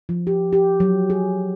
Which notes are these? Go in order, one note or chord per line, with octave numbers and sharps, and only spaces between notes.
F3
G4
G4
F#3
G#4